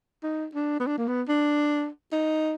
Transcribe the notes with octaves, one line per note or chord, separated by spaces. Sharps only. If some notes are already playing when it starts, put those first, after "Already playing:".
D#4
D4
B3
D4
A#3
B3
D4
D#4